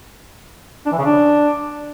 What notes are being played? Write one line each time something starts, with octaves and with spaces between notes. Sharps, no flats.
D4
E3
C#3
D4